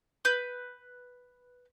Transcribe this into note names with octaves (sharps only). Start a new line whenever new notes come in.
B4 G6